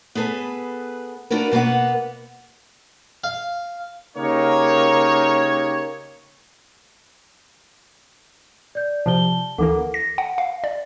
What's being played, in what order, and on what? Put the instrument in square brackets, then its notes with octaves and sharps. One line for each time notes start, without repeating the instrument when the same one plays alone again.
[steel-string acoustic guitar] B3 G#4 A4 B4
D4 F4 F#4 A#4 B4
B2 A#3 B3 B4 F#5
[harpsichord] F5
[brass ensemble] C#3 A#3 D#4 G4 A#4 C#5
[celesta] D5 G6
[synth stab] C3 F3 [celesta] A5 G7
[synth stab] D2 E3 A#3 [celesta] A4 F#5 D6
[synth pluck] A#6
F#5
F5
D5